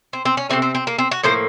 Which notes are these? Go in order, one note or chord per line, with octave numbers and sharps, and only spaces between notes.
C4
C4
C#4
C3 F3 A3 C4
C4
C4
A#3
C4
F#4
A2 F3 A#3 C5